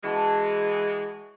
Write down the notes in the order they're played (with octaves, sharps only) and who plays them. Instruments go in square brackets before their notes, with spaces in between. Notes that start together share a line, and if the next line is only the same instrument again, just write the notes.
[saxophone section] E3 G#3 [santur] C#4 F#4 A5